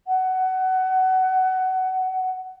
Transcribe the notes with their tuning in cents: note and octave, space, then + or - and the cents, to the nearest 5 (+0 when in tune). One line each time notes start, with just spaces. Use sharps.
F#5 +20